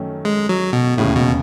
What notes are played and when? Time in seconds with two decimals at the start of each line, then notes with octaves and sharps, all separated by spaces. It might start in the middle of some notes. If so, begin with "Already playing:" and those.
Already playing: F#2 D#3 A3 C#4
0.25 G#3
0.49 F#3
0.73 B2
0.97 E1 D#2 A2 C#3
1.16 B2